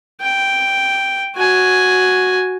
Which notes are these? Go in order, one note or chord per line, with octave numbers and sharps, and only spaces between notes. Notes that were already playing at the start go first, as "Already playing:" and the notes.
G5
F#4 G#5